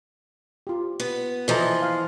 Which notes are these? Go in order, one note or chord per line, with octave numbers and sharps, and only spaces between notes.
F4 G4
B3
E3 F3 A4 D#5 A#5
F5